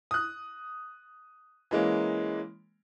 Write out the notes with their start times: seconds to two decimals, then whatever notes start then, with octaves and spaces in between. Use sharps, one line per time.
0.11 D#6 F#6
1.71 E3 G#3 A#3 C#4